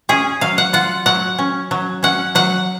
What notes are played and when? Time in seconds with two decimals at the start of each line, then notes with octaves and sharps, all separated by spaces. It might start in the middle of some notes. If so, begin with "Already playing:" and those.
0.09 C#4 G#4
0.41 F#3 F5
0.58 F#5
0.73 F4 F#5
1.06 F#3 F#5
1.38 C#4
1.71 F#3
2.03 C#4 F#5
2.35 F#3 F#5